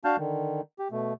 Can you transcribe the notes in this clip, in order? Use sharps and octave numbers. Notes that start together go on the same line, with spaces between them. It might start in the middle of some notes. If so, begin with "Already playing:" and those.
D4 F#4 F5 A5 F6 G6
D3 D#3
G4
B2 A3